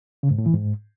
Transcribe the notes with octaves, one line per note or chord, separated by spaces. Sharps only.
C#3
G#2
A2
E3
G#2